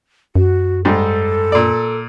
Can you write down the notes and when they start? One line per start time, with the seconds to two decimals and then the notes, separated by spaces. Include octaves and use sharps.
0.36 F#2 F#4
0.85 G#2 G3 A4
1.52 A#2 D5